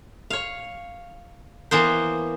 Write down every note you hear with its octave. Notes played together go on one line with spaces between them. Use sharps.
C#5 F5
E3 A#3 B3 C5